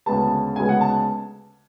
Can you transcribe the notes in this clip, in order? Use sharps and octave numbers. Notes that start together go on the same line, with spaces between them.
D2 C#3 G#3 B3 A5
D2 C#3 G#3 B3 G#5
F#5
A5